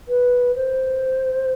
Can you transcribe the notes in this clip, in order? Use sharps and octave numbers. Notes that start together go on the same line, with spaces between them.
B4
C5